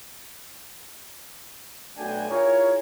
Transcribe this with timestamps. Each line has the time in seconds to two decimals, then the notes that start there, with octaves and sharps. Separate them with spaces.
1.97 B1 A3 D4 F#4 G5 G#5
2.29 E4 F4 G#4 A#4 C#5